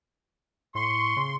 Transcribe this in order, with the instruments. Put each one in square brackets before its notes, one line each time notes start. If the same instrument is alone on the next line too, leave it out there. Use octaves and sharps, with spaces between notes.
[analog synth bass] A2 [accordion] C6 [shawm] C#6
[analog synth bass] C#3